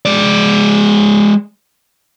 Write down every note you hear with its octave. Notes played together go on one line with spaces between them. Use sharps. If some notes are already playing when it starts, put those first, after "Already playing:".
G#3 D5